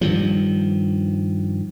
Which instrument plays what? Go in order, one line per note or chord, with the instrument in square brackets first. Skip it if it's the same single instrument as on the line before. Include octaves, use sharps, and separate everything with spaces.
[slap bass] G2 D#3 F3